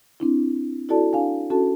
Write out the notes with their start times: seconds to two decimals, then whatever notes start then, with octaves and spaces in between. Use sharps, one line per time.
0.20 C4 D4 E4
0.89 E4 F#4 A4 D5 A5
1.13 D4 F5 G#5
1.50 C#4 F#4 A4 A5